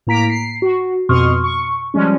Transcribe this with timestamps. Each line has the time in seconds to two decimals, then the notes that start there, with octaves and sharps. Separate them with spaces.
0.07 A2 A#3 A#5 B6 D7
0.30 C7
0.62 F#4
1.09 F2 B2 C6 C#6 D#6 F6
1.44 C#6
1.94 F3 G3 G#3 C#4